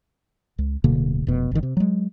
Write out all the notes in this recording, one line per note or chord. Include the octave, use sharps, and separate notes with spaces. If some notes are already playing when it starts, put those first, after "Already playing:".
C#2
D1 B2 D3 A#3
F1 B2
G1 D#3
C3
F#3 G#3